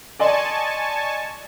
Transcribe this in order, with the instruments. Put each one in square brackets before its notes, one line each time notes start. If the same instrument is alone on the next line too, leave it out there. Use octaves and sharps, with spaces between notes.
[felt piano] D5 D#5 C6 [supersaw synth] G#5 A5 C#6